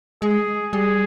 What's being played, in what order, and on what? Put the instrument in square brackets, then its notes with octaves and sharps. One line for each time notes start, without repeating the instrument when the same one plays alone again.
[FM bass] G#3 [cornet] G#4
[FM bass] G3 [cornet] G#4